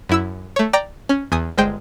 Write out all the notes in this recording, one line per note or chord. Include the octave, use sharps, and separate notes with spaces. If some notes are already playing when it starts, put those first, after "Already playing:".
F#2 E4 E6
A3 C#5
D5 G5 A#5
C#4
E2 G#5 D#6
G1 G#3 C5 G5